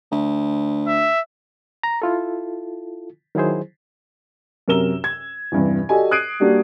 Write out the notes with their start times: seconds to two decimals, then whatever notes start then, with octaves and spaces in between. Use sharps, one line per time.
0.12 D2
0.87 E5
1.83 A#5
2.02 E4 F4 A4
3.35 D#3 F#3 E4 G#4 C5
4.68 F#2 C3 A#4 E6 E7 G7
5.04 G#6
5.52 E2 G2 C3
5.89 F#4 G4 A4 D5 D#5 G#5
6.11 D#6 F#6 G#6 C7 D7 D#7
6.40 G3 A#3 D4 F#4 G4